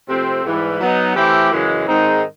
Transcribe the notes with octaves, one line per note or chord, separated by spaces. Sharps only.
C3 F3 A3 C4
G#2 E3 G3
F#3 B3 D#4
E3 A3 C4 E4 G4
F#2 C#3 E3 G#3
G#2 D#3 G#3 C4 D#4